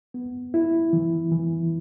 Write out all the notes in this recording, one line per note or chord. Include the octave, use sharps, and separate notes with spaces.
B3
E4
E3
E3